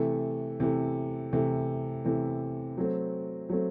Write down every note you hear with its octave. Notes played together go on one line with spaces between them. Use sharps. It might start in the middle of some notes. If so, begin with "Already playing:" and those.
Already playing: C3 E3 A3
C3 E3 A3
C3 E3 A3
C3 E3 A3
F#3 A3 C4
F#3 A3 C4